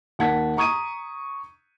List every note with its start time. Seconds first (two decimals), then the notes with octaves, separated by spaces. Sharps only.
0.19 D#2 D#3 F#5 A5 G#6 B6
0.57 A#5 C#6 D#6 G#6 D#7